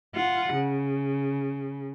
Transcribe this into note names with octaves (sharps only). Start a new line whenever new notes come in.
F4 F#5
C#3